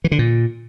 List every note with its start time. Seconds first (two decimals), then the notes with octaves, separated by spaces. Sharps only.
0.04 E3
0.12 D3
0.19 A#2